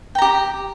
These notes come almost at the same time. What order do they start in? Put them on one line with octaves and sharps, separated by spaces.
G5 A#5 G4